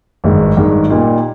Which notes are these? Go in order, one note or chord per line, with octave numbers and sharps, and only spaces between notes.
G#1 G2 D#3 G#3
G#1 G2 D#3 G#3
A#2 G3 A#3 D#4